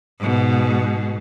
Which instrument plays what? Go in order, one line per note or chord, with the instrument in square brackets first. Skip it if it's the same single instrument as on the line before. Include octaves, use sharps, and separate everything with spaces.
[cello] G#2 B2